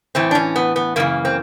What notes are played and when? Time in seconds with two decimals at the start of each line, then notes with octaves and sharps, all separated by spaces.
0.15 A2 E3 C4
0.31 D4
0.35 C#4
0.56 B3
0.76 B3
0.96 F#2 C#3 E3 A#3
1.25 C4